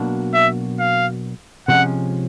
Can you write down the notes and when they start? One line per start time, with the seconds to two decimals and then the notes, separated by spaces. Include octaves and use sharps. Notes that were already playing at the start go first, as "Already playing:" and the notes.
Already playing: B2 F#3 A#3 D4 F#4
0.34 E5
0.79 F5
1.68 C3 F3 G#3 C#4 F#5